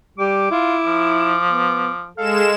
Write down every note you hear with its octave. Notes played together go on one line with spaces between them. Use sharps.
G3 D6
E4 F4
F3
B3
G#3 A4 F5 E7